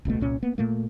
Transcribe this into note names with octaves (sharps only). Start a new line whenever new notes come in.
D#1 C#2 B2 A3
C2 A#2 C#4
A#3 B3
A#2 A3 A#3